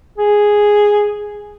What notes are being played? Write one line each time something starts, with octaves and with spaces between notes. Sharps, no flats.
G#4